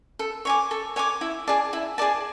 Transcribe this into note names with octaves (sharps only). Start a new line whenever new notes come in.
A4
C#5 G#5 D6
A4
C#5 G#5 D6
E4
G#4 D5 A5
E4
G#4 D5 A5